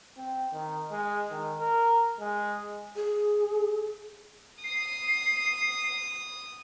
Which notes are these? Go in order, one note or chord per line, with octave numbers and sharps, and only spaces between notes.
C4
D#3
G#3
D#3
A#4
G#3
G#4
D#6 C7